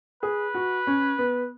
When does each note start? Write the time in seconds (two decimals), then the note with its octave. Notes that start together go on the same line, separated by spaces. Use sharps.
0.23 G#4 B4
0.55 F#4
0.87 C#4
1.18 B3